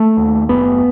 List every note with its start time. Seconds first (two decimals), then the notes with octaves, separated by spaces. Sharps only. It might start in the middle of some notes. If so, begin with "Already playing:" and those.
Already playing: A3
0.17 D#2
0.49 F#1 B3